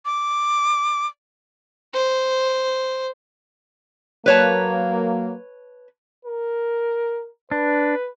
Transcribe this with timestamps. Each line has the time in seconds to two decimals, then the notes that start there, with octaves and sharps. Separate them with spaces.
0.05 D6
1.93 C5
4.26 F#3 A#3 B4 C#5 A5
6.25 A#4
7.51 D4 B4